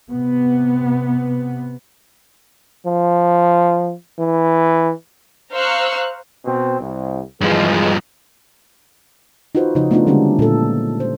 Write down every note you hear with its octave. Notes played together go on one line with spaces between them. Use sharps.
C3 B3
F3
E3
C5 F5 A#5 C#6 E6 F#6
B2 C4
C2
G2 E3 F3 G#3
D#4 F4 F#4 B4 C5
C#3 F3 D#4 C#5
A3 B3 D4 D#4 F4
D3 G3 G#3 C#4 D4 G4
A#2 A4
C5